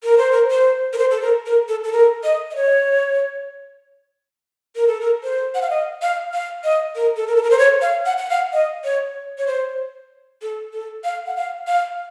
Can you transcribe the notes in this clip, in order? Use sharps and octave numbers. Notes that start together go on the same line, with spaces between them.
A#4
C5
A#4
C5
A#4
C5
A4
A#4
A#4
A4
A4
A#4
D#5
D#5
C#5
A#4
A4
A#4
C5
F#5
F5
D#5
F5
F5
D#5
A#4
A4
A#4
A4
A#4
C5
C#5
F5
F#5
F#5
F5
D#5
C#5
C#5
C5
A4
A4
F5
F#5
F5
F5